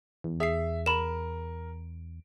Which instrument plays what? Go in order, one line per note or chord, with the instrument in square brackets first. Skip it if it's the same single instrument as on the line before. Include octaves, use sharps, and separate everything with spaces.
[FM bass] E2
[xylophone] G#4 C7 [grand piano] E5
[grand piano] A#4 [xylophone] B5 E7